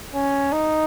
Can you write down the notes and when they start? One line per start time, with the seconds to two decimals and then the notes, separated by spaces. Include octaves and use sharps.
0.14 C#4
0.52 D#4